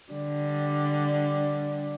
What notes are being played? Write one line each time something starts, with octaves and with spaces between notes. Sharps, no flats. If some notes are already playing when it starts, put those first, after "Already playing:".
D3 G3